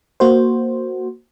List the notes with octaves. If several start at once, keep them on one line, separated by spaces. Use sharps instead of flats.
A#3 F#4 C5